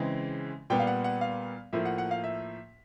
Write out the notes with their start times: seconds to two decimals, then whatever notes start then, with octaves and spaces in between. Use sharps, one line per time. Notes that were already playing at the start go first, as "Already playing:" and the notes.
Already playing: C#3 E3 G#3 C4
0.70 A#2 G3 B3 G5
0.80 F5
0.87 F#5
1.04 F#5
1.21 F5
1.73 A2 F3 A#3 E5
1.85 F#5
1.98 F#5
2.11 F5
2.24 E5